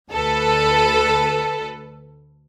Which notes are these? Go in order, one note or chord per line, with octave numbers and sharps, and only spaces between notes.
D2 A4 B4